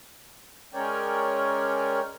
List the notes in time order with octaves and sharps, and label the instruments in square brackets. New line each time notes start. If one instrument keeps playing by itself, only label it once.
[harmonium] G#3 C#4 A#4 C#5 D5 G5